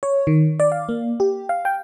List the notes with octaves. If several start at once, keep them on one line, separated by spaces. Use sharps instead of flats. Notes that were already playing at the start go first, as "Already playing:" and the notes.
C#5
D#3
D5
F5
A#3
G4
F5
G5